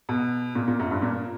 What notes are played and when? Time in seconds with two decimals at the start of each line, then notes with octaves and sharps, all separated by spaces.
0.09 B2
0.55 A#2
0.68 A#2
0.80 F#2
0.91 G2
1.02 A#2